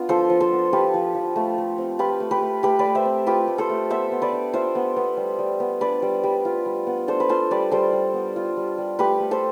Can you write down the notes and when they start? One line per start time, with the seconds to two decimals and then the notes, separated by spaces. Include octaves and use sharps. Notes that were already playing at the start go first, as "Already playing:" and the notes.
Already playing: B3 D4 F4
0.09 F3 A4 C5
0.30 F3
0.40 A4 C5
0.52 B3
0.73 F4 G4 B4
0.94 F3
1.15 F3
1.36 A3
1.58 A3
1.78 C4
1.99 F4 G4 B4
2.20 A3
2.31 G4 B4
2.42 A3
2.63 A3 G4 B4
2.79 B4 D5
2.85 A3
2.95 C5 E5
3.05 C4
3.27 F4 G4 B4
3.48 A3
3.58 A4 C5
3.69 A3
3.90 B3 C5 E5
4.12 B3
4.22 B4 D5
4.32 D4
4.53 F4 C5 E5
4.75 B3
4.96 B3
5.17 G3
5.39 G3
5.60 B3
5.81 D4 B4 D5
6.02 G3
6.23 G3
6.45 F4
6.66 G3
6.87 B3
7.08 D4 A4 C5
7.20 B4
7.29 F4 A4 C5
7.51 G3 B4 D5
7.71 G3 A4 C5
7.93 G3
8.14 B3
8.36 F4
8.57 G3
8.78 G3
8.99 A3 G4 B4
9.20 A3
9.31 A4 C5